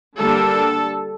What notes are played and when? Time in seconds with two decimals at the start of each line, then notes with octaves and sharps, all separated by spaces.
0.17 D3 G3 A#3 D4 A4